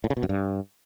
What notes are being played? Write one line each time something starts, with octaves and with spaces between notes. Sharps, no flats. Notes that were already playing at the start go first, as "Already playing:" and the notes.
A2
C#3
B2
F#2
G2